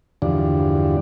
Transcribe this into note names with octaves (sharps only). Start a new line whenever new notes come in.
E2 G2 D3 F3 D4